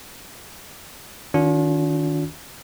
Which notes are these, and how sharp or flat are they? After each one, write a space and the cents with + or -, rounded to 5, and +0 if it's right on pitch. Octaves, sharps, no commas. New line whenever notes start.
D#3 +0 D4 -45 F4 +45